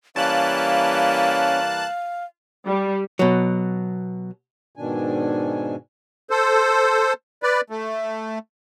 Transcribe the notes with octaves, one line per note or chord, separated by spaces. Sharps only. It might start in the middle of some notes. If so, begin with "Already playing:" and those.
E3 G3 A#3 C#4 F5 A5 F#6
G3
B2 F#3
G#2 B2 D#3 D4 G#5
A4 C5
B4 D5
A3